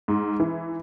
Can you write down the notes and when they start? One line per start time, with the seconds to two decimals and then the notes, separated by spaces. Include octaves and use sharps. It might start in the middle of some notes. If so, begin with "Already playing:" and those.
0.08 G#2
0.40 E3